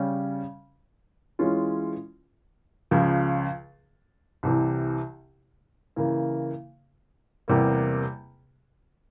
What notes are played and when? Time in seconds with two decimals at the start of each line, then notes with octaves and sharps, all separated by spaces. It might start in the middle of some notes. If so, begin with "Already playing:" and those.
Already playing: C#3 G3 C#4
1.39 E3 G#3 C#4 F4
2.91 C#2 C#3 F3
4.43 C2 C3 E3
5.96 C#3 E3 A#3
7.48 E2 C3 G3 A#3